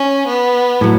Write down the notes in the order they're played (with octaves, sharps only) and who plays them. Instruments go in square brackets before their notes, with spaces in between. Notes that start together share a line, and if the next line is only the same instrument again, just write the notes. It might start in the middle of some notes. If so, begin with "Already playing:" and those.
Already playing: [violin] C#4
B3
[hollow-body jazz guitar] A2 F#3